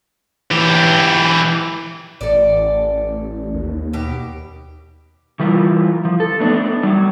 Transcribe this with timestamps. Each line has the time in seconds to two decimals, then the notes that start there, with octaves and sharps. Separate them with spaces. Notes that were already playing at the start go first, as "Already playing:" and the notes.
0.51 E3 G4
2.21 A1 A4 D5
3.54 D#2
3.93 B2 G4
5.40 E3 G3 E4 F4 A#4
6.05 F3
6.20 A4
6.39 A3 B3 D4 D#4
6.83 F#3 G3